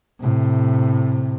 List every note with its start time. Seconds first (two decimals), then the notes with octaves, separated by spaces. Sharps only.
0.21 A2 C3